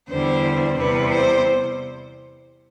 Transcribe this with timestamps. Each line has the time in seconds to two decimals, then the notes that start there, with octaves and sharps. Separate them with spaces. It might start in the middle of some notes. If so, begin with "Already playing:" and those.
0.09 E2 D3 G3 C5
0.77 E2 C3 G3 B4
1.10 C5